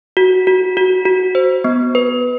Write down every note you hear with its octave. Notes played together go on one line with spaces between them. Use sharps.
F#4
F#4
F#4
F#4
C5
B3
B4